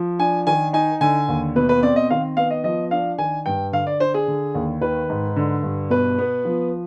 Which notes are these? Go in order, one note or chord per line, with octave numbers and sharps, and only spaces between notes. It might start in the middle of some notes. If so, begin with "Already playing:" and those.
Already playing: F3
D4 G#5
D#3 G#5
D#4 G#5
D3 G#5
D#2
B2 B4
B4
C4 D5
D#5
D#3 F5
B3 F5
D#5
F3 D#5
D4 F5
D#3 G#5
G2 G5
D3 F5
D5
D4 C5
G#4
D3
D#2
D#3 B4
G#2
D3
G2
B2 B4
B3
F3